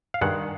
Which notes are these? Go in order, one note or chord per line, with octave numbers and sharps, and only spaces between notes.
F5
G2 D#3 G#3 F#5